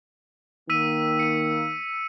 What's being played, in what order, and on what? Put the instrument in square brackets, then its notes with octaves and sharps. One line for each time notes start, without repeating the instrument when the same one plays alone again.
[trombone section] D#3 A#3 [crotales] E6 B6 D#7
[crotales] C#7 D#7